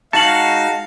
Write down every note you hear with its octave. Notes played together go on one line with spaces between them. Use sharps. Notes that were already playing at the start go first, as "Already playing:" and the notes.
G#3 D#4 F#4 F5 A5 C#7 F#7